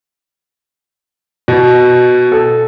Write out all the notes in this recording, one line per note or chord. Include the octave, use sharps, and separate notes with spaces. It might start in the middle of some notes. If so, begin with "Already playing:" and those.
B2
A4